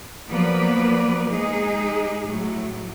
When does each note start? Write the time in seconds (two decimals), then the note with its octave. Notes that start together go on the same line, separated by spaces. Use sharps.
0.29 F3 F#3 A#3 B3 B4 D5
1.31 G#3 D#4 G#4
2.25 A2 F#3